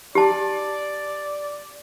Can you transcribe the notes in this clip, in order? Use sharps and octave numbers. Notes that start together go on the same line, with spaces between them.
G4 D5 A5